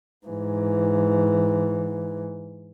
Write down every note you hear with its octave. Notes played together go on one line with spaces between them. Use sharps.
G#2 E3